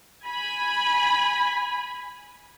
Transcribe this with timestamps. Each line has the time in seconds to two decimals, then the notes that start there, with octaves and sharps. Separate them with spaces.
0.23 G#5 B5